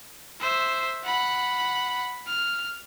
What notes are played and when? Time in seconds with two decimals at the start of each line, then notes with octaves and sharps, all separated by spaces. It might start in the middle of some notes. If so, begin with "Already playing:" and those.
0.40 C5 E5
1.04 F#5 B5
2.27 F6